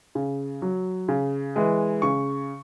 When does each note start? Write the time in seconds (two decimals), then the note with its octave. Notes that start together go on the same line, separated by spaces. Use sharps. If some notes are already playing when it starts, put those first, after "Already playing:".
0.15 C#3
0.62 F#3
1.08 C#3
1.56 E3 G#3
2.02 C#3 C#6